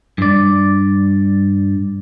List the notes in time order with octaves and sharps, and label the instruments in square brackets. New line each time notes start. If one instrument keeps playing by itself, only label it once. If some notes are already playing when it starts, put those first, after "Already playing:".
[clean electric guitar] G2 D5